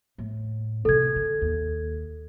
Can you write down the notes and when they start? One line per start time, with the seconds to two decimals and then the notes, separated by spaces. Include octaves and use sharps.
0.18 A2
0.85 C3 E3 A4 G#6
1.16 D3
1.41 D#2